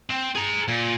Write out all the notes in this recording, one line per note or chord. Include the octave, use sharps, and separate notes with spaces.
C4
G#4 A#5
A#2